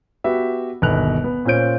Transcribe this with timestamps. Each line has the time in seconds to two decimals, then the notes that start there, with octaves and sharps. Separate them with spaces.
0.24 B3 F#4 G4 E5
0.82 G1 D#2 B2 F#6 F7
1.24 B3
1.45 A#2 C#4 F4 C5 G6 D7